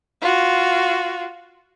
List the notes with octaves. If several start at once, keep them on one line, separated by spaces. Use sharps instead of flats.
F4 F#4